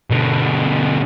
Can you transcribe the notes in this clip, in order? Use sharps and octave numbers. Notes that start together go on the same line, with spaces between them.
B2 D3